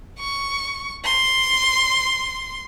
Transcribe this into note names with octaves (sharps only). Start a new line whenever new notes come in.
C#6
C6